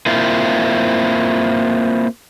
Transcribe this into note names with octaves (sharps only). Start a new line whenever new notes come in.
A#3 C4 E4 F4